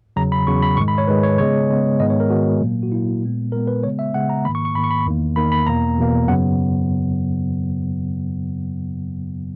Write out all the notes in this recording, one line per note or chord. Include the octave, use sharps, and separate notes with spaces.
E2 C#3 F#3 A#5
B5
E2 C#3 F#3 C#6
B5
G#2 D#3 G#3 C#6
B5
C#5
G#2 D#3 G#3 B4
C#5
C#3 G#3 B3 C#5
C#3 G#3 B3
G#2 D#3 G#3 B3 D#5
C#5
A#4
G#2 D#3 G#3 B3 F#4
A#2 F#3 A#3
F#4
A#2 F#3 A#3 E4
A#2 G#3 B3
A#2 G#3 B3 A#4
B4
C#3 G#3 B3 C#5
E5
C#3 G#3 B3 F#5
A#5
G#2 D#3 A#3 B5
C#6
C#6
G#2 D#3 A#3 B5
C#6
B5
E2 D#3 A#3
E2 D#3 A#3 B5
B5
E2 B2 A#3 A#5
E2 B2 A#3
F#2 C#3 F#3 B3 F#5